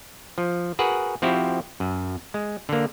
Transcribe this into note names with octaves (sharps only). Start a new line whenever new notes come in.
F3
F#4 G#4 A#4 B4 F#5
F3 C4 E4 F#4 G4
F#2
G#3
D3 A#3